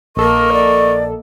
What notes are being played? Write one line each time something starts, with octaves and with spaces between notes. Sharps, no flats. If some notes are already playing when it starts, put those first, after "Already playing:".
A#1 A#3 A4 A#4 D#5 C#6
D5